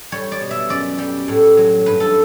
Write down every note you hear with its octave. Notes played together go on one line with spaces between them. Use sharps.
G3 C#5
D5
B2
E5
F#2 D5
G3
A2
F#3
G2 B4
A4